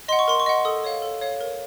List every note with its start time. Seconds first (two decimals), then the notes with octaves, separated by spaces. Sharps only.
0.08 D#5 F#5 C6
0.19 C#6
0.28 A#4 C6
0.40 C#6
0.46 D#5 F#5 C6
0.65 A4 D#6
0.84 C#5 F5
1.02 A4
1.21 C#5 F5
1.41 A#4